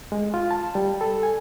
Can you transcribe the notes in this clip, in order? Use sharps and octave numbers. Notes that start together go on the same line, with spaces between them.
G#3
F4
A5
G3
A4
G#5